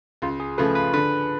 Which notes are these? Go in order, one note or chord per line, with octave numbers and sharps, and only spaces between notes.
C#2 F4
G#4
C#3 F3 A3 B4
B4
D3 B4